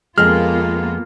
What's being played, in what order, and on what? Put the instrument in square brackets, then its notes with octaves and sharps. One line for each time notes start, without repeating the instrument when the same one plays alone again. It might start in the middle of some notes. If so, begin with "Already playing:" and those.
[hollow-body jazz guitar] F2 G#3 [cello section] A#3 B3 F4 [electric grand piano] F6